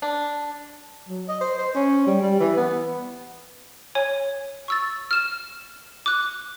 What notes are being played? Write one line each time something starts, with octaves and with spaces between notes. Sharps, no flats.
D4
F#3
D#5
C5
C5
C#4
G3
G3
E3
B3
C#5 G#5
C#6 E6 A6
F6 E7
D6 F#6